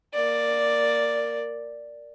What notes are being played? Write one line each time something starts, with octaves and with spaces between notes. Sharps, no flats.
A#3 D5